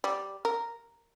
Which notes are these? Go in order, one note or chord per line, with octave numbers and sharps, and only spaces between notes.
G3
A#4